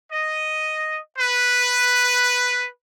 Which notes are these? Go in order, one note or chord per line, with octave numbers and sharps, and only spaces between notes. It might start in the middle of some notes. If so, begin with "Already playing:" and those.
D#5
B4